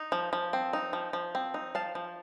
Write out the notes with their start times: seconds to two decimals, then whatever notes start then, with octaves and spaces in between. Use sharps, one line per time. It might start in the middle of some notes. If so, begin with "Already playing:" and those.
Already playing: D#4
0.12 F3
0.33 F3
0.53 C4
0.73 D#4
0.93 F3
1.13 F3
1.35 C4
1.54 D#4
1.75 F3 F5 A5
1.95 F3